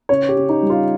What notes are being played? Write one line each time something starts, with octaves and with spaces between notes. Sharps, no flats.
C#3 C#5
G4
C#3
D#4
G3
F4